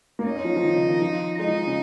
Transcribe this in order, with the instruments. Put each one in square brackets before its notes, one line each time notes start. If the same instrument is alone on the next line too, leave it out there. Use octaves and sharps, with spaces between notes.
[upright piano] A#3
[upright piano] C#4 [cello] D#4
[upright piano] C#4
F3
F3
D#3
C#3
D#3
F3
[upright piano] G#3 [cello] D#4
[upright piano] F3
C#3